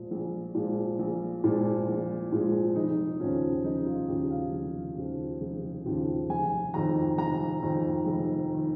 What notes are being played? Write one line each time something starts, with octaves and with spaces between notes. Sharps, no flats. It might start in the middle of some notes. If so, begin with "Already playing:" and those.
Already playing: A#2 F3 G#3
A#1
A#2 F3 G#3
A#1
A#2 F3 G#3
A#1
A#2 F3 G#3
F1 D#4
D#2 C#3 F3 C#4
F1 D#4
F4
D#2 C#3 F3 G4
F5
F1
D#2 C#3 F3
F1
D#2 C#3 F3
F1 G#5
F2 D#3 A#5
F1 A#5
F2 D#3
F1
D#3